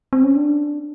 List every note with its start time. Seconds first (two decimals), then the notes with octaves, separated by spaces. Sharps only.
0.13 C4
0.24 C#4
0.36 D4